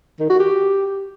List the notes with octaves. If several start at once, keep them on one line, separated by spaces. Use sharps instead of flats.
D#3
F#4
G4